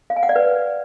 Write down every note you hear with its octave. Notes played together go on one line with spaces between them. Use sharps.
F5
G#5
F#5
D5
B4